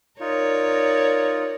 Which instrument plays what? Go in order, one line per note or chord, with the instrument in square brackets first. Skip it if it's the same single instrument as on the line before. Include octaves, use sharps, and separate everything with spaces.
[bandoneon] D#4 F4 [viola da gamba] A#4 C#5 D5